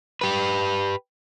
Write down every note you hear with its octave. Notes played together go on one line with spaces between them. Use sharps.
G4 B4